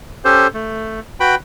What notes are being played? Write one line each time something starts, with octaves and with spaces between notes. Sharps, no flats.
C#4 G4 A4 C5
A3
F#4 B4 G5 B5